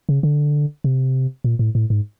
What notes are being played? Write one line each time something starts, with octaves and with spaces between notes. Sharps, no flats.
C#3
D3
C3
A#2
A2
A2
G#2